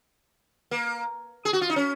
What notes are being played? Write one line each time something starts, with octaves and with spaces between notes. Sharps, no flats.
A#3
G#4
F#4
F4
D#4
C#4